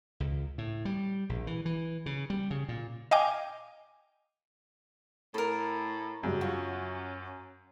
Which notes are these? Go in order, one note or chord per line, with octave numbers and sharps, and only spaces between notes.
C#2
A2
G3
A#1
E3
E3
C#3
G3
C#3
A#2
D#5 F5 G5 G#5 D6
A2 A4 A#4
F#2 C#3 F#3 G3
C#4 F4 F#4